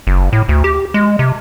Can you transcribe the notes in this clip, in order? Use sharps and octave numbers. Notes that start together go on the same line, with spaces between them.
F#1
A2
D2
G4
G#3
C3